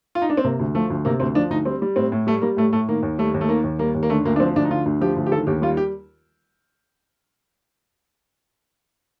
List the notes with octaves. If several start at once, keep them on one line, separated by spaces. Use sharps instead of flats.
F4
D#4
D4
C4
C3 A#3
D2
F3 A3
D2
C3 A#3
D2 C4
F3 D4
D2 D#4
G3 C4
G3
A2 C4
A2
G3 A3
G3 A#3
A2 A3
A2 A3
D#3 A#3
D#2
G3 A3
D#2
A3
D#3 A#3
D#2
G3 A#3
D#2
A#3
D3 A3
D2 A#3
D4
F3 C4
D2 D4
D#4
D3 F4
D2
F3 G4
D2
G4
D#3 A4
D#2 G4
G3 F4
G4